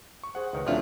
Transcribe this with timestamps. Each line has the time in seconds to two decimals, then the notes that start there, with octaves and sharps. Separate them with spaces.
0.23 C#6
0.35 G#4 C5 F#5
0.53 C#2 D#3 A#4 B4
0.67 D2 A2 C3 F3 F#3 D4 F4 E5